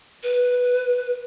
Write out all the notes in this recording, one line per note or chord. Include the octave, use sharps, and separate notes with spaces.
B4